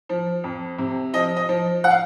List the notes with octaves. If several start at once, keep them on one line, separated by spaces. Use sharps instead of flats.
F3
F2
C3
F3 D#5
D#5
F3
F#5
F5